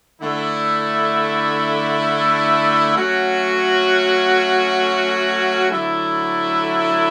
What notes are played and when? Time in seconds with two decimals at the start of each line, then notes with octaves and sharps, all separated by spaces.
0.21 D3 A3 E4
2.96 F#3 A3 C#4 F#4
5.70 D3 F#3 A3 E4